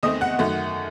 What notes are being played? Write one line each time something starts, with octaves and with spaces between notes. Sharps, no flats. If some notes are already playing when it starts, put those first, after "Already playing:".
E2 D#3 A3 C4 D#5 D#6
F#5 F#6
F#2 D#3 A3